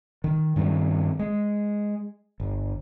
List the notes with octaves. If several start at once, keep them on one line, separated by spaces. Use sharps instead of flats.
D#3
G2 D#3 G3 C4
G#3
G1